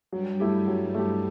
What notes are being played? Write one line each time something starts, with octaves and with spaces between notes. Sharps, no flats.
G2 F#3 G3
A3 E4 G4
F#3
A3 E4 G4